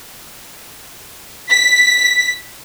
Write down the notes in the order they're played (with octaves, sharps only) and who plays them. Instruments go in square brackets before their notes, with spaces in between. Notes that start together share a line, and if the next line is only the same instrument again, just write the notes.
[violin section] B6